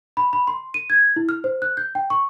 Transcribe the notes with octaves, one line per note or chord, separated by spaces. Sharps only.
B5
B5
C6
D#7
G#6
E4
F6
C5
F#6
G6
G5
C#6